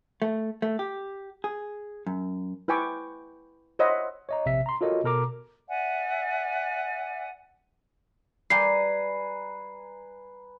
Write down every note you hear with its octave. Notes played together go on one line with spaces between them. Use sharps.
A3
A3
G4
G#4
F#2
E4 B4 G5 G#5 C#6 D6
C5 C#5 D#5 E5 F#5 B5
C#5 D#5 A#5
A#1 C3 E5 B6
A#5 C6
F4 F#4 A4 A#4 C#5 D#5
B2 A4 A#4 A#5 D6
D5 E5 F#5 G#5
G3 G4 B4 G#5 A#5 C7